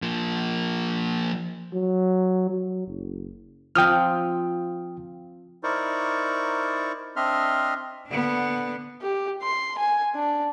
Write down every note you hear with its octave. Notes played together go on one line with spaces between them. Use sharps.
F3 A#3
F#3
F#3
F#1
F3 C4 G5 D#6 F6
D#4 E4 A#4 C5 D5 C#6
C4 D4 D#5 E5 C6 F6
D3 B3
G4
C6
G#5
D4